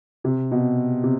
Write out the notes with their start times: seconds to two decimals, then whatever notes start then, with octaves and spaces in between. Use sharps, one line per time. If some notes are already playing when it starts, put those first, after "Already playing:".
0.24 C3
0.51 B2
1.04 C3